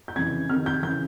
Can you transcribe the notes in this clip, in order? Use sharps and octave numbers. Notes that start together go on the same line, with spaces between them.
G6
F2 C#3 E3 G#6
F2 C3 D#3 F6
G6
C#3 E3 G6